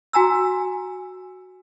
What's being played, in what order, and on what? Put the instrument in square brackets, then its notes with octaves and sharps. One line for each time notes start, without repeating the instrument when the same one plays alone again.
[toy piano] F#4 G#5 A#5 E6